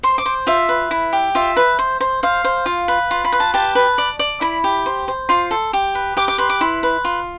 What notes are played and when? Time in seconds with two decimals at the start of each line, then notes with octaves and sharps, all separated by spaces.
0.03 C5 C6
0.18 D6
0.26 C5
0.47 F4 E5
0.69 B4
0.91 E4
1.13 G4
1.35 F4 E5
1.57 B4
1.79 C5
2.01 C5
2.23 C5 F5
2.44 C5
2.66 F4
2.88 B4
3.11 F4
3.25 B5
3.33 B4
3.40 A5
3.54 G4 A5
3.75 B4
3.98 D5
4.19 D5
4.41 E4 B5
4.64 G4
4.86 C5
5.08 C5
5.29 F4 C6
5.51 A4
5.73 G4
5.95 B4
6.17 G4 D6
6.28 D6
6.38 B4 C6
6.50 D6
6.61 E4 C6
6.83 B4
7.05 F4